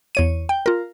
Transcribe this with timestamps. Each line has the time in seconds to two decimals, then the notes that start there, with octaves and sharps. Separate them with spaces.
0.15 E2 C#5 D#7
0.49 G5
0.66 F4 A#4